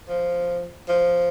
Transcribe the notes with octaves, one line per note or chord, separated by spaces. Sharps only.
F3
F3